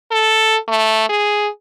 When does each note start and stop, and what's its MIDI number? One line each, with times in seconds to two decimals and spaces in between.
0.11 0.57 69
0.68 1.08 57
1.09 1.48 68